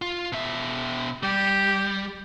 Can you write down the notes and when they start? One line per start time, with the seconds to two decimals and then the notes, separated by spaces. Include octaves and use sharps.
0.02 F4
0.32 B2 E5
1.23 G3 G4